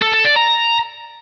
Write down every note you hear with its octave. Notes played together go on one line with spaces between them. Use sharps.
A4
A4
D5
A#5